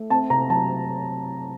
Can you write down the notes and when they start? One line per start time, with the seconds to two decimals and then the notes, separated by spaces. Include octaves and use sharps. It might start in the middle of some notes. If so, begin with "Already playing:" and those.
Already playing: A3
0.10 C4 A5
0.30 C3 A#5
0.50 F#3 A5